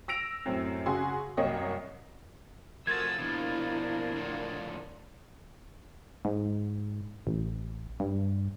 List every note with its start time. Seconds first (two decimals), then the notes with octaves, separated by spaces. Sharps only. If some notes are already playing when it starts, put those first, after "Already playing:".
0.08 E6 A#6 D7 F7
0.46 F#2 A2 C4
0.86 C#3 F#4 G#4 G#5 C6
1.37 C2 F#2 A#3 C#5 D#5
2.87 F3 A3 F#4 A#4 D#6 E6 G#6 A6
3.18 B2 D#3 F3 A#3 D4 E4
4.16 A2 D3 F3
6.25 G#2
7.27 A1
8.00 G2